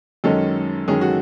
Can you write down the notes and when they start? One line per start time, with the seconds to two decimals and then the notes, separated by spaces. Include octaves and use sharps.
0.24 F#2 D#3 G#3 C#4 A4
0.88 F#2 D#3 G#3 C#4 G#4
1.01 F#4